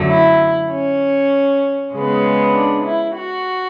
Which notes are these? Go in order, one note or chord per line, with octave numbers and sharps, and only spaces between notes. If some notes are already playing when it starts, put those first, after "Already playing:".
Already playing: F#2 D3 F#3 A3
E4
C#4
C#3 G#3 B3
D4
E4
F#4